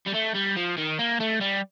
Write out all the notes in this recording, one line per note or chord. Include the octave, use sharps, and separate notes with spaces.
G3
A3
G3
F3
D#3
A#3
A3
G3